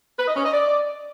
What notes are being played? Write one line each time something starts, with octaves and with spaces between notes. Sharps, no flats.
B4
D#5
C#4
D#5
D5